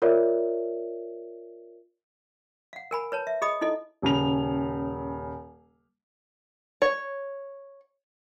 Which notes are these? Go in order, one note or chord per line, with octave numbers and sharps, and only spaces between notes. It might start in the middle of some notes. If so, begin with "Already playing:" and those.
F4 A#4 C#5 D5 E5
F5 F#5
A#4 G#5 B5
B4 C#5 A5
E5
G#4 D#5 B5 D#6
D#4 E4 A4 D#5
D#1 C#3 F7
C#5